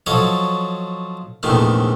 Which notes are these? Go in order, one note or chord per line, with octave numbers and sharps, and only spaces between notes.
F3 F#3 A4 C#5 D#5
A#1 E2 C3 D#3 A3